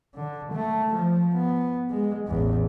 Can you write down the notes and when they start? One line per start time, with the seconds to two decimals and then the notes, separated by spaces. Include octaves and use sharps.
0.15 D3
0.53 A3
0.95 F3
1.34 B3
1.90 G#3
2.27 A1 E2